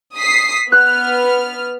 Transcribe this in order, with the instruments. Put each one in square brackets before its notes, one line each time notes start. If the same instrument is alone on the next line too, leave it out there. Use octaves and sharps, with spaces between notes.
[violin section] D#6 B6 C7
[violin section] B3 F6 [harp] F#6